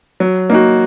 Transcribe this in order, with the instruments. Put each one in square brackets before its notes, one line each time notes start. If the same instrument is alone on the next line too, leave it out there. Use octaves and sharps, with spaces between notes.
[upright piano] F#3
A#3 D#4 F#4